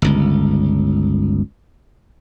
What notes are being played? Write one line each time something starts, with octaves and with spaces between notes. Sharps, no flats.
G1 C#2